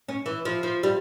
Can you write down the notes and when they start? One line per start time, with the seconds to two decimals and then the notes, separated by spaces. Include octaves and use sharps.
0.09 C#4
0.26 E3
0.45 F3
0.63 F3
0.83 G3